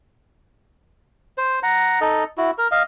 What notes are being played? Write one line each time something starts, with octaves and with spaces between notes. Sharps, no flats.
C5
F#5 A#5
D#4 A4 D#5
E4 F#4
A#4
D#5 F5